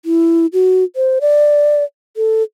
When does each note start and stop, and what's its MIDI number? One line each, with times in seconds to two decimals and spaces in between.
0.05 0.46 64
0.53 0.84 66
0.96 1.19 72
1.21 1.84 74
2.17 2.43 69